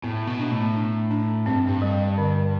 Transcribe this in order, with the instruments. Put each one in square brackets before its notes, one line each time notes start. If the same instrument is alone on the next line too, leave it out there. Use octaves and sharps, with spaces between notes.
[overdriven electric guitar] A2 [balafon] B3
[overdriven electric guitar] B2
[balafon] D4
[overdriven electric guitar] A2
[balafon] D4
D4
[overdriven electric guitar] G2 [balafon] C4
[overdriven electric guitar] G2
[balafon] G3
D3